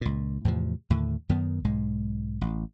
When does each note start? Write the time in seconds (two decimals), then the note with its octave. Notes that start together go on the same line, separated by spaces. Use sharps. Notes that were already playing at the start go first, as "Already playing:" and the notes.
0.01 C#2 A#2
0.45 E2 A2 C3 F3
0.90 D#2 A2 D3
1.29 F#2 D#3 B3
1.64 B1 G#2 G#3
2.41 A1